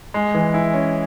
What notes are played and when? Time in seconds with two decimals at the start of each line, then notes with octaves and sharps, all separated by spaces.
0.14 G#3
0.35 E3
0.54 E4
0.74 C#4